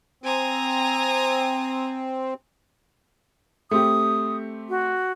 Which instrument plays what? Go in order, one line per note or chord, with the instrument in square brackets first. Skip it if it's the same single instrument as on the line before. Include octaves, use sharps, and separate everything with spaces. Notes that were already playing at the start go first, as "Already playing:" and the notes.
[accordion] C4 [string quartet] G#5 A#5 D#6
[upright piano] A3 C4 G4 [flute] D#6
[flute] F#4